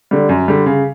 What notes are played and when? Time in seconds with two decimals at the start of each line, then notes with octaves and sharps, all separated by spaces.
0.11 D3 G3
0.29 F#2
0.48 D3 G3
0.66 C#3